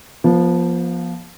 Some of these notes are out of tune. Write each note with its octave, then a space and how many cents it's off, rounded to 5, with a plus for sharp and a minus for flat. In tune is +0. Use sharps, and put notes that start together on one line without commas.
F3 +0 B3 -40